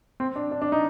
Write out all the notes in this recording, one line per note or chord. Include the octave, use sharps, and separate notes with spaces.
C4
D4
D4
D4
D#4